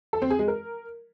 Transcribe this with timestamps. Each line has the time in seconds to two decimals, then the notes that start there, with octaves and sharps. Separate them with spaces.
0.13 A4
0.22 C4
0.30 G#4
0.39 G#3
0.48 A#4